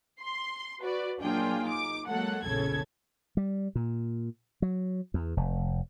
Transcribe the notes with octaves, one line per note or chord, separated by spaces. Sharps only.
C6
F#4 B4 D5
F#3 A#3 D4 F4 G#4 G5
D#4 D6
F#3 G#3 A#3 A4 F#5
A#1 E2 C#3 A4 G#6
G3
A#2
F#3
E2
F1